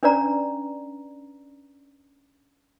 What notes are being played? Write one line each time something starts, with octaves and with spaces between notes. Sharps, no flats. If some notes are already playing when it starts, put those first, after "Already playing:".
C#4 D4 B4 D5 A#5